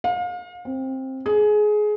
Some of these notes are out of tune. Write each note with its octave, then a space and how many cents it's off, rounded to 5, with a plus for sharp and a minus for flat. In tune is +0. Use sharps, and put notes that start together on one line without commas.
F5 +35
C4 +15
G#4 +20